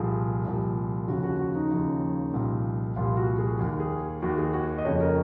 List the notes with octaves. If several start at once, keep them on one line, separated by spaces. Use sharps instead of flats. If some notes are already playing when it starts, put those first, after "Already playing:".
Already playing: C2 A#2 F3 G#4
C2 A#2 F3
D#2 C#3 F3 F#4
F#4
F#4
D#4
D#2 C#3 F3
C2 A#2 F3
C2 A#2 F3 F4
F#4
G#4
D#2 D#3
G#4
D#2 D#3 F#4
G#4
F#4
D#5
F2 C#3 F3 C#5
A#4